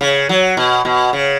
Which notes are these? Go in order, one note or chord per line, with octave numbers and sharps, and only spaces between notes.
C#3
F#3
B2
B2
C#3